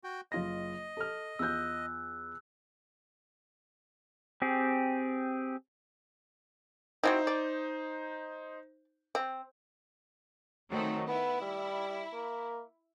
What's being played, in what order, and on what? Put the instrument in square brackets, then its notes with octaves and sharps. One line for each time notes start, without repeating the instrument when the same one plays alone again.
[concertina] F#4 G5
[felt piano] F#1 F4 A#6 [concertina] D#5
[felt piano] A4 F6
[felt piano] E2 F4 G6 [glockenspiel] E6 F#6
[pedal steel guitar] C4 G4 G#4
[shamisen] C4 E4 F#4 [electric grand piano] D#4 C5
[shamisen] D5
C4
[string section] D#3 A3 C4 [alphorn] F#3
[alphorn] B3 [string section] E4
[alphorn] G3
A#3